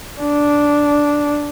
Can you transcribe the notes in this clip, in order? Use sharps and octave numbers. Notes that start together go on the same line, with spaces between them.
D4